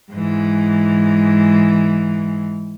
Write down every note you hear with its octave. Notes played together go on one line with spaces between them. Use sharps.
G#2 E3